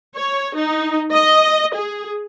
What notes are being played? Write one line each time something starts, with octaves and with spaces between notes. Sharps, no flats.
C#5
D#4
D#5
G#4